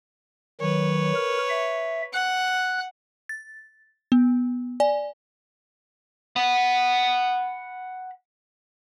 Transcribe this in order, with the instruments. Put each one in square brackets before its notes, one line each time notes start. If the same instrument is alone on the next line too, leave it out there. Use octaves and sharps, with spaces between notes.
[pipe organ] D#3 F#3 [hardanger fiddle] B4 C#5
[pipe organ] A#4
E5
[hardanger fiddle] F#5 [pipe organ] F#6
[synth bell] A6
B3
D5 G#5
[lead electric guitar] F#5 B5